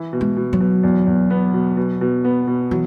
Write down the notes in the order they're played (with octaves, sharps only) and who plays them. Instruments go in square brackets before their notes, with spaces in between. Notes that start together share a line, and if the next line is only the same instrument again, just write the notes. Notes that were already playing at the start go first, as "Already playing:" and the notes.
Already playing: [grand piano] E3 E4
B2
[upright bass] G#3
[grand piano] B2
[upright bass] F#3
[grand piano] B2
E2
E2
B3
B2
B2
B2
B3
B2
[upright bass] E3 [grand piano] F#3